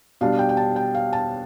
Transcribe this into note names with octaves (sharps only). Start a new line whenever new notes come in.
B2 G3 D4 F5
G5
G5
A5
G5
F5
A5